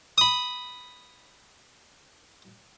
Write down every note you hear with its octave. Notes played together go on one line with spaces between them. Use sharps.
B5 D#6